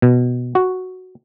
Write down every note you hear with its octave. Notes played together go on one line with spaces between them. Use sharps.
B2
F#4